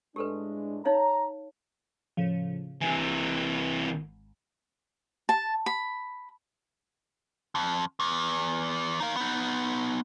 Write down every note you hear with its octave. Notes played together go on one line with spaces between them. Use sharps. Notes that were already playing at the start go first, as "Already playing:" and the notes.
A2 G#3 D4 G4 A4 B4
D#4 C#5 F5 A#5
A2 C#3 F3
C3 E3 G#5
G#1
A5
B5
F2
E2
D#4 F5
B3 D#4